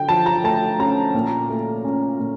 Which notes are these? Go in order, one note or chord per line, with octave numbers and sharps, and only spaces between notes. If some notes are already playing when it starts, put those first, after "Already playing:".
Already playing: D3 G5
F3 A5
A#5
A3 A5
C#4 A#5
A#2
A3
C#4
A#2